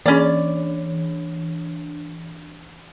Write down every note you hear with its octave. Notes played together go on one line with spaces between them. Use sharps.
E3 C#4 D4 D5